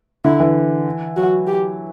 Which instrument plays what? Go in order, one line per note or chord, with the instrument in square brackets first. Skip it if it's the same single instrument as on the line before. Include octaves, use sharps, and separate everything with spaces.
[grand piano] D3 [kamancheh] E4
[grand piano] E3
[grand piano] F#3 [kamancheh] F#4
[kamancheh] G4